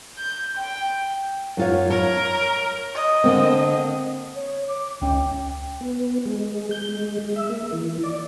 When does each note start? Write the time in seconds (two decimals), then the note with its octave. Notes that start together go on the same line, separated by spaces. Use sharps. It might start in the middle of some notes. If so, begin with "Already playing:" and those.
0.19 G6
0.57 G5
1.57 F#2 F4 C#5
1.90 A#4 C#5
2.94 D#5
3.24 D3 A#3 C4
4.35 C#5
4.68 D6
5.01 C#2 C#4 G5
5.81 B3
6.26 G#3
6.71 G6
6.89 G#3
7.19 G#3
7.36 E5
7.49 A#3
7.72 E3
8.03 D5